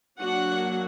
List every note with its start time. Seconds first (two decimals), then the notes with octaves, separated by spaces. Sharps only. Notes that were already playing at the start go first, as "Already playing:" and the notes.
0.20 F#3 A#3 D4 F#4 F#5